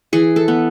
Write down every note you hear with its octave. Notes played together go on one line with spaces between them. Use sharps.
E3 G#4
A4
B3